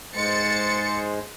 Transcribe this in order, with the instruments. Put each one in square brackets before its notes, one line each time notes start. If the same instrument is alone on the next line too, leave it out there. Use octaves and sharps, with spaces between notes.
[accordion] G#2 G#3 [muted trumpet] C5 [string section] A6 C#7